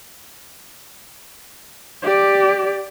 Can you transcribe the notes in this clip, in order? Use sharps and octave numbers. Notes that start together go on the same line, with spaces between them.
G4 D5